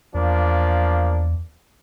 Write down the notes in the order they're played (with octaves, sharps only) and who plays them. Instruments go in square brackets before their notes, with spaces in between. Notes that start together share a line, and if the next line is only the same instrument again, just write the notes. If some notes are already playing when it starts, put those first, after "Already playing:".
[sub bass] E2 [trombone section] F3 A#3 D4